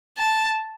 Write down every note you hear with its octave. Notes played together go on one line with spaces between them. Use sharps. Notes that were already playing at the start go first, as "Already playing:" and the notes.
A5